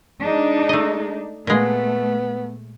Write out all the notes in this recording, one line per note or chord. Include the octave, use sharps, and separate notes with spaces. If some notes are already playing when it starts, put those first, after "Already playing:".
G#3 D4 D#4
A3 D#5
A#2 G#3 A3 B3